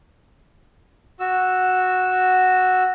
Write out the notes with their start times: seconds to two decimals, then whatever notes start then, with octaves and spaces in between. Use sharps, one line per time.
1.20 F#4 E6